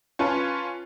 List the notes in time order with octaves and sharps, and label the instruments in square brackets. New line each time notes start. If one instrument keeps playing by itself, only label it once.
[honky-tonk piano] C#4 F4 B4 C#5 A5